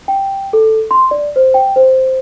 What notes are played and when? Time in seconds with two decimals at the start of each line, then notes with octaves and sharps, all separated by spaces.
0.08 G5
0.53 A4
0.91 C6
1.11 D5
1.36 C5
1.54 G5
1.76 C5